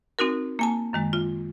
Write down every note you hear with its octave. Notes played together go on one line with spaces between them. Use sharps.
C4 D#4 F#4 A#4
A#3 G#5 A5
F#2 D#3 G#3
F4